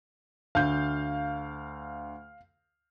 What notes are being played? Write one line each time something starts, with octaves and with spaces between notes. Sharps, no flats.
D2 F5 G6